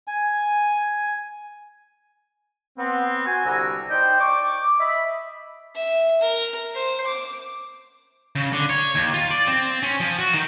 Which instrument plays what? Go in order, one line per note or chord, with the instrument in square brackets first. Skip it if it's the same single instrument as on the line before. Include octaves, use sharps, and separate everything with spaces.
[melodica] G#5
[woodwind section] B3 C4
F#4 G#5
C2 D3 G3 F#4 A#5 E6
D#4 C5 D5 G5
C#6 D6
D#5 E5 B5
[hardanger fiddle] E5
A#4
C5
D6
[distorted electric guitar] C#3
D3
C#5
D#2
F4
D5
C4
C#4
F3
F#4
D#3